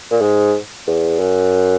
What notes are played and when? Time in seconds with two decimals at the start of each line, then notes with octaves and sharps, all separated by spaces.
0.11 A#2
0.21 G#2
0.87 E2
1.19 F#2